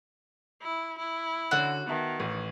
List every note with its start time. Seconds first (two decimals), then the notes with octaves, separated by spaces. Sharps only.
0.62 E4
0.98 E4
1.51 D3 C#4 F#4
1.87 D#3 B3 E5 A5
2.20 A1